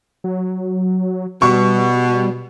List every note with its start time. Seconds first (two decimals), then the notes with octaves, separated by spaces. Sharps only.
0.24 F#3
1.42 B2 G3 C#6